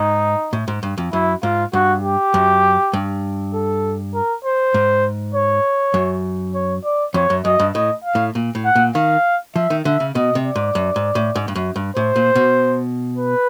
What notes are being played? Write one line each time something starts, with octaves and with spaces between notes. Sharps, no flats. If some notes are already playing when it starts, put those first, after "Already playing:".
Already playing: G#2 D#4
A2
G#2
G2
F2
F#2 E4
G#2 F4
G2 F#4
G4
F#2
G2
A4
A#4
C5
G#2
C#5
F#2
C#5
D5
F2 C#5
F#2
F#2 D#5
G2
A2 D#5
F5
A2
A#2
A2
F#5
A#2
D#3 F5
F3 E5
D#3
D3 E5
C#3
B2 D#5
C3
D5
G#2
F#2
G#2
A2
G#2
G2
F#2
G2
A2 C5
A#2
B2
B4